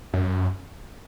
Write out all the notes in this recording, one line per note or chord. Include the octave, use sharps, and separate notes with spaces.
F#2